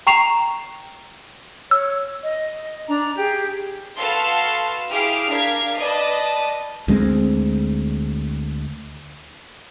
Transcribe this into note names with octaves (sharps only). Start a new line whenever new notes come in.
G5 A#5 C#6 C7 E7 F7
C#5 E6
D#5
D4 A#5
G4 G#4 G5
F#4 A4 B4 F5 A5 C6
E4 G4 G#4 F5 F6 D7
D4 A#4 F5 G#6 B6
B4 D5 D#5 A5 B5
D2 G#3 A#3 C4